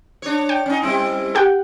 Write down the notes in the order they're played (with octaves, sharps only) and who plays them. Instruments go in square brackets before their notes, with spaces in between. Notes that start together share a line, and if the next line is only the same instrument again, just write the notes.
[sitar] D4 C#5
[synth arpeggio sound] G5
[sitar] C#4 D#4
G3 C4 E4
[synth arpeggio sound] G4 F#5 G5